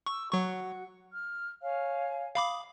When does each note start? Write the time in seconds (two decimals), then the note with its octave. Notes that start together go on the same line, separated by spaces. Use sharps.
0.06 C#6 D6 E6
0.31 F#3 F#4 F#5 C#6
1.11 F6
1.62 C#5 F5 G#5
2.35 F5 B5 D6 D#6